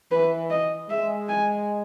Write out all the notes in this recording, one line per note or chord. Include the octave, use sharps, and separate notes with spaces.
E3 B4
D#5
G#3 E5
G#5